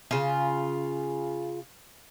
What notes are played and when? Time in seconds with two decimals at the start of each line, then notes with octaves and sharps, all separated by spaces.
0.11 C#3 F4